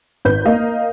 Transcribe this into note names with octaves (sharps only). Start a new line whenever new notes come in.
G#1 B4 G6
A#3 A#4 D#5 F5